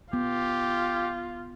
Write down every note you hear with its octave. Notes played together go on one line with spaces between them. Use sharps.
B3 F4 G4